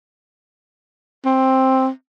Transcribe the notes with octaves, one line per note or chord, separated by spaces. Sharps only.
C4